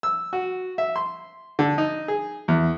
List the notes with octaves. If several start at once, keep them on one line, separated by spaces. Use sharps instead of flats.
E6
F#4
E5
C6
D3
D#4
G#4
E2